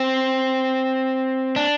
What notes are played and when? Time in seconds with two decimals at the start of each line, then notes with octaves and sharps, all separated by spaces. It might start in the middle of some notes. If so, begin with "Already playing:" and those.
Already playing: C4
1.56 D4